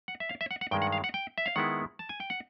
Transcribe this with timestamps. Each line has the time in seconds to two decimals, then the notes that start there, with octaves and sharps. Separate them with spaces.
0.08 F#5
0.20 E5
0.29 F5
0.41 E5
0.51 F#5
0.61 F#5
0.71 G2 D#3 G#3 G5
0.82 F#5
0.92 F5
1.04 F#5
1.14 G5
1.38 E5
1.46 F5
1.56 D#3 G#3 B3 E4 F#5
1.99 A5
2.09 G#5
2.20 G5
2.30 F#5